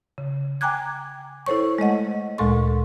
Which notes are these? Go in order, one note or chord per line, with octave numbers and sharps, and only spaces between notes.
C#3
G5 G#5 A#5 D6 F#6 G#6
E4 A4 C5 C#5 C#6
G#3 A3 D#5 F#5
D2 A#2 G#3 A4 C6 C#6